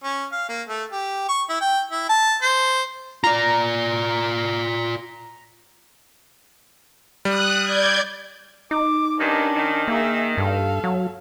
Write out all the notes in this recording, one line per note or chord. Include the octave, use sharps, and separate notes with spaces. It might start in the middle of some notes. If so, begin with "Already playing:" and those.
C#4
F5
A#3
A3
G4
C#6
E4
G5
E4
A5
C5
F4 D5 A#5
G3 D#6 F#6
D5 G6 G#6
D#4 D6
G2 D#3 C#4 D4
D#3
A#3 G#4 E5
G2 A4 F5
F#3